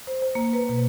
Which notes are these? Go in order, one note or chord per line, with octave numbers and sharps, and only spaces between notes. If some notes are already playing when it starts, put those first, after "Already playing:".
C5
C5
A#3
B4
B2